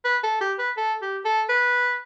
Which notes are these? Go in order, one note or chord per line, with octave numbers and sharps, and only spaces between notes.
B4
A4
G4
B4
A4
G4
A4
B4